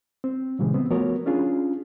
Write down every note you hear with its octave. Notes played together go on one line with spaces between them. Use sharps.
C4
A#2 C#3 E3 G3 G#3
B3 C4
F3 A3 B3 F#4 A#4 C#5
C#4 D4 F4 G#4